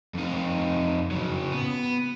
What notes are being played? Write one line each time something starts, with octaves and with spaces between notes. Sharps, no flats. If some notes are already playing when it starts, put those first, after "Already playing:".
F2 D#4
C#3 F#3
B3